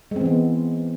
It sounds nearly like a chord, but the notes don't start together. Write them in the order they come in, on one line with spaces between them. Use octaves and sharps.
G#3 C4 E3 B3